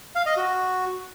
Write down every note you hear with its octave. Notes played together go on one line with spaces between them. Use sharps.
F5
D#5
F#4